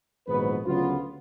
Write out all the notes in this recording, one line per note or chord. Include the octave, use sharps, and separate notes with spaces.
A#1 G#2 D#3 F#3 B3 B4
D2 C#3 F#3 B3 F4